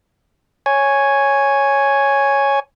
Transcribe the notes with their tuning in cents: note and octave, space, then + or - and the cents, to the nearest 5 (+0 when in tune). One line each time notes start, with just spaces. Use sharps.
C#5 +0 G#5 +0